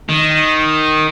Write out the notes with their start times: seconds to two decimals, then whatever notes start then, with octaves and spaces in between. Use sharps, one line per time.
0.09 D#3